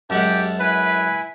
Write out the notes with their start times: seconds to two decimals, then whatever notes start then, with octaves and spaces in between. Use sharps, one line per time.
0.10 F#2 G#3 G4 F#5 A5 E6
0.60 E4 B4 G#5 B5